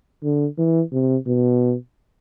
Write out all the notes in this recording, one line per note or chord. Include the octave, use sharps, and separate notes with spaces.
D3
E3
C3
B2